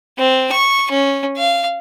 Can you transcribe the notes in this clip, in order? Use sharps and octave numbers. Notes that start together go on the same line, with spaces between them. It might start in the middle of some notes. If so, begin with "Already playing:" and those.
C4
C#6
C#4
F5